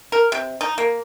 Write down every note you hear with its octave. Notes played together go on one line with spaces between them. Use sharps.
A#4
C3
D#4
A#3